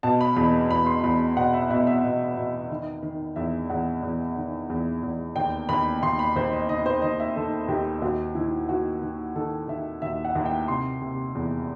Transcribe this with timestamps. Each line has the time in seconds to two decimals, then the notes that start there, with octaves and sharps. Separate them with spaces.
0.03 B2 A5
0.21 B5
0.36 E2 B5
0.70 E2 B5
0.86 C6
1.04 E2 B5
1.37 B2 F#5
1.54 E5
1.70 B2 E5
1.87 E5
2.03 B2
2.37 B2
2.70 D#3
3.03 D#3
3.36 E2 E5
3.70 E2 F#5
4.03 E2
4.36 D#3
4.70 E2
5.03 E2
5.36 D#2 G5
5.69 D#2 B5
6.03 D#2 C6
6.19 B5
6.36 D#2 C5
6.53 D#5
6.69 D#3 D#5
6.86 C5
7.02 D#3 D#5
7.20 E5
7.36 D#3 A4
7.68 D#2 G4
8.02 D#2 F#4
8.35 D#3 E4
8.69 D#3 F#4
9.02 D#3
9.35 D#3 A4
9.68 D#3 E5
10.02 D#2 E5
10.25 F#5
10.35 D#2
10.46 G5
10.68 C3 C6
11.02 C3
11.35 E2